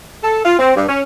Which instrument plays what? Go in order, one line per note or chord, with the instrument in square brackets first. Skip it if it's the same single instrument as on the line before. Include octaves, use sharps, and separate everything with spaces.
[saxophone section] A4
F4
C4
G2
C#4